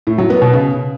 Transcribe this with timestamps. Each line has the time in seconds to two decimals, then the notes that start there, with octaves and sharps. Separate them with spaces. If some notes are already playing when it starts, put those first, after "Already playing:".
0.07 A2
0.18 F#3
0.30 B3
0.42 B2
0.53 C#3